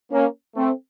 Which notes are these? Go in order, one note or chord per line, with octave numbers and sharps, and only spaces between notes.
A#3 C#4
A3 C4